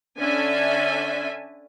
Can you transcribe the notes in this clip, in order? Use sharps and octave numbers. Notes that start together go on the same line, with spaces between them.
D3 C#4 D4 E5 G#5